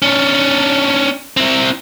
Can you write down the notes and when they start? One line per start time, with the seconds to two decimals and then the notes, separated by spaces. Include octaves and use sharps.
0.02 C#4 D4
1.37 C4 E4